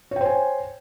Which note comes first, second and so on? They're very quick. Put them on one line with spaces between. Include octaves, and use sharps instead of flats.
C#5 G5 C5 G#5